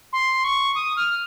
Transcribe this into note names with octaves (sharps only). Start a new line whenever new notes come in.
C6
C#6
D#6
F6